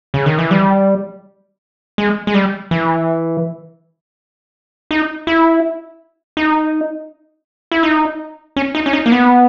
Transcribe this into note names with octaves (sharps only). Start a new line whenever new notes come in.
C#3
D#3
E3
G3
G#3
G#3
G3
E3
D#4
E4
D#4
E4
D#4
C#4
D#4
C#4
D#4
A#3
B3